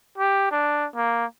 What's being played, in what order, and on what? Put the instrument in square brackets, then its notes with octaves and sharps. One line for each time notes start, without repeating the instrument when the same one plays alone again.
[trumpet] G4
D4
A#3